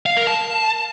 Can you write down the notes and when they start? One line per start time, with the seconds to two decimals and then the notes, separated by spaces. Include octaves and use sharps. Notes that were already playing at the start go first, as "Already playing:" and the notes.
0.06 F5
0.17 A#4
0.27 A5